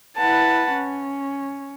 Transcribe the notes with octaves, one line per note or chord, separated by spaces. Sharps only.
E4 B4 F#5 A5
C#4